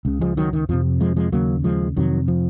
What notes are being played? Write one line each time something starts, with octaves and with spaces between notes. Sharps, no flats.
C#2 C#3
F3 G#3
D#3 F#3
D#3
F2 C3 F3
F3 G#3
F3 G#3
D#2 C#3 F#3 A#3
F3 G#3
F2 C3 D#3 F#3
F3